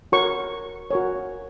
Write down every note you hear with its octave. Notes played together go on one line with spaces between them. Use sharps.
F#4 A#4 C#5 C#6
F#4 A#4 C#5